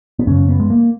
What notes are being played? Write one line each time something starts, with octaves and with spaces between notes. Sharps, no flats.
B3
F#2 C#3 C#4
B3
G#3
A#3